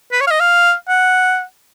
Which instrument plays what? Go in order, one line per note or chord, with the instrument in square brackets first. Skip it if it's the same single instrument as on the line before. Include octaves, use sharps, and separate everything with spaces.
[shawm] B4
C#5
F5
D#5
F5
F#5